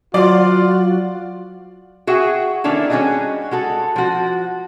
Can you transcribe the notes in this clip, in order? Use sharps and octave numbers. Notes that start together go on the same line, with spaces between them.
F#3 F4 F#4 C5 D5 C6
F#4 G#4 E5 F#5 G5
D#3 A#3 C#4 D4 E4 A4
G3 C#4 D#4 F#4 G#4 D#5
G#3 F#4 A4
F3 F#4